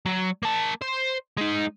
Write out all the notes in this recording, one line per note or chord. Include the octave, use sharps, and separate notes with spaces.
F#3
A#3 A5
C5
G#3 D#4